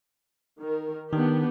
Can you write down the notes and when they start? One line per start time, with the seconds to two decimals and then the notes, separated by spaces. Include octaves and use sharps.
0.59 D#3 A#4
1.13 D#3 B3 D4 G4